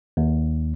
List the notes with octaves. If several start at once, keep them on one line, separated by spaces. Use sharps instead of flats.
D#2